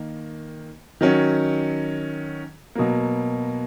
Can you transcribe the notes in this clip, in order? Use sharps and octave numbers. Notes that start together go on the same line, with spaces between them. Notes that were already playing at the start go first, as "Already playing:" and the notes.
Already playing: D#3 A#3
D#3 F#3 C#4
B2 F#3 A#3